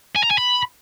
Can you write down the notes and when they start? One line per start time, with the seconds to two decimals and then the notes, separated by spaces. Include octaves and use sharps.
0.16 G#5
0.23 A#5
0.31 G#5
0.38 B5